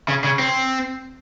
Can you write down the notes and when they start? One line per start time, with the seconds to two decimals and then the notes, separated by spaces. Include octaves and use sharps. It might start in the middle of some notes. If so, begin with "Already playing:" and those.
0.08 C#3
0.24 C#3
0.39 C4